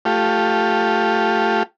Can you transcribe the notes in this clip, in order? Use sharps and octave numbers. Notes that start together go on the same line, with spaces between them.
A3 F4 G4